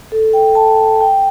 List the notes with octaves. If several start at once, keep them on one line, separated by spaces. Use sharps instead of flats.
A4
G5
A5
G5